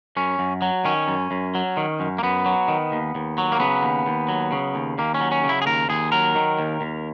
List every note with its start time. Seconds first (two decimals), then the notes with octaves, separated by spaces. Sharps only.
0.17 F#2 C#4
0.39 F#2
0.62 F#3
0.85 D#3 C#4
1.08 F#2
1.31 F#2
1.55 F#3
1.77 D#3
2.00 F#2
2.18 A#3
2.23 F#2 B3
2.46 F#3
2.68 D#3
2.92 D#2
3.15 D#2
3.38 F#3
3.52 A#3
3.60 C#3 B3
3.83 D#2
4.06 D#2
4.28 F#3
4.52 C#3
4.75 D#2
4.98 D#2 A#3
5.14 C#4
5.21 F#3
5.32 C#4
5.43 C#3
5.49 E4
5.62 G#4
5.66 D#2 A#4
5.89 D#2 G#4
6.12 F#3 A#4
6.35 D#3
6.59 D#2
6.81 D#2